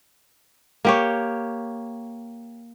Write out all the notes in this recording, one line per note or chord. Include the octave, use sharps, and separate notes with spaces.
A#3 G4 C#5